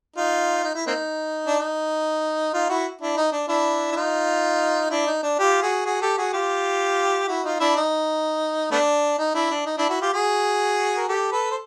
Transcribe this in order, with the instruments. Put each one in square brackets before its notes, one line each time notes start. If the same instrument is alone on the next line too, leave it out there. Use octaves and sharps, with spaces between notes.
[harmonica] D#4 F4
D#4
E4
A#3 C4 D#4
D4
D#4
D#4 F4
E4 F#4
D4 E4
D#4
D4
D4 E4
E4
D#4 F4
D4 E4
D#4
D4
F4 G4
F#4 G#4
F#4 G#4
G4 A4
F#4 G#4
F4 G4
E4 F#4
D#4 F4
D4 E4
D#4
A3 B3 D4
D#4
D4 E4
D4
D#4
D4 E4
E4 F#4
F4 G4
F#4 G#4
A#4
G4 A4
A4 B4
C5